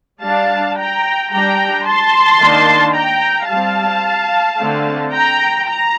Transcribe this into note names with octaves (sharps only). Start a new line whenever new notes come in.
G3 D4 F5 A5
G5 A#5
G3 D4 G5 A#5
A5 C6
D#3 A#3 D4
G5 A#5
G3 C4 F5 A5
D3 A3 C4
G5 A#5
A#5